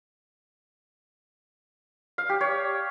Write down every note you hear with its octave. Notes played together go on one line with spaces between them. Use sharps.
F5
G4
C#5